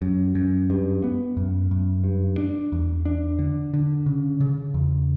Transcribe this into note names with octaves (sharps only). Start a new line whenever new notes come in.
F#2
F#2
G2
B3
F#2
F#2
G2
D4
E2
D4
D3
D3
C#3
C#3
E2